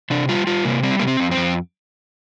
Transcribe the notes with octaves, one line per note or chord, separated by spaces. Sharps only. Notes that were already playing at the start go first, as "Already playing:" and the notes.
C3 D4
G3 F4
G3 F4
C3 A#3
G3 C4
C3 A#3
C4
F2
C4
F2